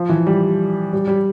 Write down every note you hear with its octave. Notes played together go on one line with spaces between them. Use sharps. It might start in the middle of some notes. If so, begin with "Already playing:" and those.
Already playing: F3
E3
G3
G3
G3